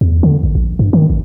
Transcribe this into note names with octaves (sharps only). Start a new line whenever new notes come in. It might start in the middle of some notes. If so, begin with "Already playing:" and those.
E2
D3
A1
A#1
G2
D#3
A1